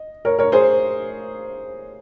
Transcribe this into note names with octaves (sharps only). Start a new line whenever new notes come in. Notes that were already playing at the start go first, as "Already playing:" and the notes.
Already playing: D#5
A#4 C#5
A#4 C#5
G#4 C5